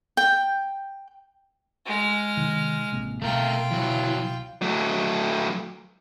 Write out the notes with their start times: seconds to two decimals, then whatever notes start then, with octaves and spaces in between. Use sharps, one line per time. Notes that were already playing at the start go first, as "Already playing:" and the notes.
0.17 G5
1.86 G#3 F6
2.37 C3 D#3
2.92 A1 C3 A#3
3.22 C2 B2 A3 F4 A#4 G5
3.71 E3 F#3
4.62 F#3 A3